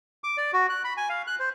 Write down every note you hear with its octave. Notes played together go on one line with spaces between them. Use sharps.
D6
D5
F#4
F#6
B5
G#5
F5
F#6
C5